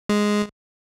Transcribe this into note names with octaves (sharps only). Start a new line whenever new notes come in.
G#3